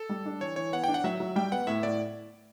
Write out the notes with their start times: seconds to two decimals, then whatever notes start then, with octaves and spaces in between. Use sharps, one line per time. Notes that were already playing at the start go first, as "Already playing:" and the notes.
Already playing: A4
0.09 G3
0.26 D4
0.41 E3 C#5
0.56 E3 C#5
0.72 B3 F#5
0.84 D4 G5
0.94 F#5
1.04 F#3 E5
1.20 F#3
1.36 G3 G5
1.52 B3 F#5
1.67 A2 E5
1.83 A2 D5